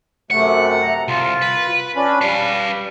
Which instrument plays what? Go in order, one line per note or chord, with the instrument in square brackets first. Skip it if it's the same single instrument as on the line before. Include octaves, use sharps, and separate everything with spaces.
[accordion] F#2 C3 A3 [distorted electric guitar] F#5
[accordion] A#5
[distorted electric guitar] C2 [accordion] F4
[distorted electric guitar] B4
[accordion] C#4 D4 B5
[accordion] G3 [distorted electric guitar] B4 F5